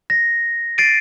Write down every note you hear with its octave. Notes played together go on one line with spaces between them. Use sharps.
A#6
A6 C7 D7 D#7